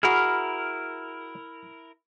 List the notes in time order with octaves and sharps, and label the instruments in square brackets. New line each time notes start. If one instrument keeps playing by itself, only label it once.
[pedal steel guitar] E4 A#4 [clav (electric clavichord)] F#4 G#4 [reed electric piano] B5 F6